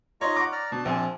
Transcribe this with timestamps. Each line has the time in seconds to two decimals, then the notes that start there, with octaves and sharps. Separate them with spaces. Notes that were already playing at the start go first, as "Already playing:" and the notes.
0.21 D#4 F4 C#5 D#5 A#5
0.36 F#5 C#6 D6
0.52 D5 A#5 F6
0.72 B2 D4 A5
0.85 A#1 C4 G#5